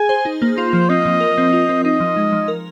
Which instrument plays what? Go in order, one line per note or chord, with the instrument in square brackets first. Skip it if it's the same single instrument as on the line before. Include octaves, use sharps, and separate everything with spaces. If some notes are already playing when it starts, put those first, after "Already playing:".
Already playing: [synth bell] G#4 [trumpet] G#5
[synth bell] C5
D#4
A#3
[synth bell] F4 [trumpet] C5
[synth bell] F3
[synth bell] C4 [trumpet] D#5
[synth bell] F3
A#4
C4
F4
C4
[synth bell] D#4 [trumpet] D#5
[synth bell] F3
G#3
F3
A#4